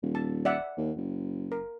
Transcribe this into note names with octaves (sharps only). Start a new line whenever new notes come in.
D#1
A5
D5 E5 F#5
D#2
F#1
A#4